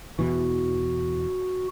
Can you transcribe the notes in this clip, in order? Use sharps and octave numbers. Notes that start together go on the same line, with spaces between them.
E2 B2 E3 F#4